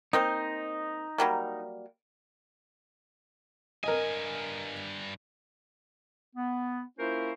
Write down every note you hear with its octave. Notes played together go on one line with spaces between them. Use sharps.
A#3 C4 D#4 C5
F#3 G3 A#3
G2 A#4 D#5 G#5
B3
A#3 C#4 E4 F4 A#4 C5